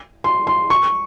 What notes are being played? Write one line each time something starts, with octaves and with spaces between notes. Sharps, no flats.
C6
C6
C#6